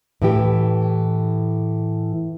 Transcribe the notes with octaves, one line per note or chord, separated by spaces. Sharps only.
A2 E3 G4